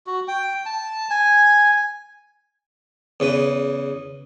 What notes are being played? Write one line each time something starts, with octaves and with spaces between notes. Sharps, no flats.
F#4
G5
A5
G#5
E2 C#3 B4